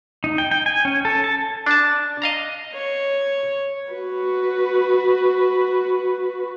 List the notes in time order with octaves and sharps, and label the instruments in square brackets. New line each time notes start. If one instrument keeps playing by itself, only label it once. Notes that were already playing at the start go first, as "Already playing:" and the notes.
[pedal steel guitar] D#4
G5
G5
G#5
C#4
A4
A5
[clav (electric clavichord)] D4 A5
D#5 F5 A#5
[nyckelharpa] C#5
[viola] F#4 B4